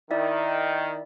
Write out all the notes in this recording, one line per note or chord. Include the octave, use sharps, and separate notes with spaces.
D#3 E4 D5 E5